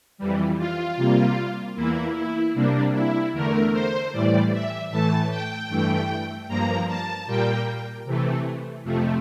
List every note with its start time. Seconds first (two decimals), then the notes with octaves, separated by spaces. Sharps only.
0.18 F2 E3 G3
0.58 F4
0.97 C3 G3 A#3
1.76 E2 E3 A#3 E4
2.15 E4
2.54 C3 G3 A#3 D4
2.94 E4
3.33 E2 D3 A3 A#4
3.73 C5
4.12 A2 E3 G3 D5
4.52 E5
4.90 A2 E3 A3 A5
5.30 G5
5.69 G2 E3 A3
6.48 G2 F3 A#3 A#5
6.88 A5
7.27 A#2 G3 A#3 G5
8.05 C3 E3 A3
8.84 F2 C3 F3 A3